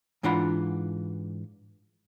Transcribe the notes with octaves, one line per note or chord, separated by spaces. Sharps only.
G#2 E3 D4 F4 F#5 B5